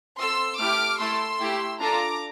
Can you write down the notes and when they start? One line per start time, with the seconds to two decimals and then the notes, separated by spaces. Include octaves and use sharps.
0.19 C4 F4 A4 C6 E6
0.59 A3 E4 G4 D6 F6
0.99 A3 E4 A4 C6 E6
1.39 A3 E4 G4
1.80 D4 F4 A4 A#5 D6